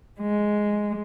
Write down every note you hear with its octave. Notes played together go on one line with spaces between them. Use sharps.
G#3